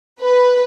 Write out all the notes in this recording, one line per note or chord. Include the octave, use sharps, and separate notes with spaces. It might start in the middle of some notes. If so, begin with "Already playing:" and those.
B4